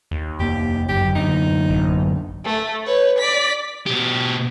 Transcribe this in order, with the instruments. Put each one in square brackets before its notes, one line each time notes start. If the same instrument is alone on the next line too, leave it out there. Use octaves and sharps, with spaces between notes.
[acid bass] D#2
[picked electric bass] F1 A#3 [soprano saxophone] G4
[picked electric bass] G1 F#2 [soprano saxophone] G4
[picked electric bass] F#2 D3 [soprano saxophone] D#4
[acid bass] A1
[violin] A3
B4 C#5
D5 B6
[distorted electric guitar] B2 G4